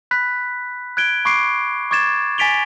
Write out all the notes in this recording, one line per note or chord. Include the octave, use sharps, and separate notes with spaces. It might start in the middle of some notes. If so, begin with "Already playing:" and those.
B5 F#6 B6
F#6 G#6 D7 G7
B5 C#6 D6 C7 D7
C#6 D6 G#6 A6 E7
G#5 A6 B6 D7 F7 G7